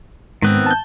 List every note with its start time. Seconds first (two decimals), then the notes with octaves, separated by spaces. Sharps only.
0.42 G#2 D#3 B3 C4
0.66 A5 G6